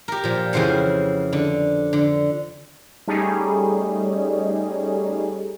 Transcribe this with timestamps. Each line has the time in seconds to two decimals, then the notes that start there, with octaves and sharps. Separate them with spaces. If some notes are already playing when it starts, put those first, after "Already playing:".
0.08 G4 A#4
0.24 A#2 F3
0.53 F2 C#3 E3 C5 F#5
1.33 D3
1.93 D3
3.08 G3 A3 C#4 D#4 G#4